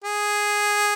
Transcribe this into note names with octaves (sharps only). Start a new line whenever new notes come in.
G#4